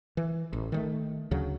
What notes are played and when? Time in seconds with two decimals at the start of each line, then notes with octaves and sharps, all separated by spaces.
0.17 E3
0.53 A1
0.72 D#3 F#3 A3
1.31 D2 C#3 F#3